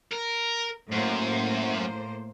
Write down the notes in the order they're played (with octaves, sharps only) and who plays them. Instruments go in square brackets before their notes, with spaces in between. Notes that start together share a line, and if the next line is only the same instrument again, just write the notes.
[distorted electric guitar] A#4
[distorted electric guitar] F#2 [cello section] A2 A#3 C5